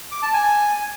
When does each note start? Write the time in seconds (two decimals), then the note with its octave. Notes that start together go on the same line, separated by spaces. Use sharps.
0.12 D6
0.23 A5
0.34 G#5